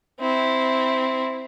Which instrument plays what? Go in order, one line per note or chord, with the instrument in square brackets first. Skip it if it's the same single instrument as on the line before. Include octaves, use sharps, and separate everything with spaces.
[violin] C4 E4